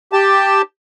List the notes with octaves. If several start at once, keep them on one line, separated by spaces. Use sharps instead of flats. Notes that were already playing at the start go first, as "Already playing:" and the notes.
G4 A5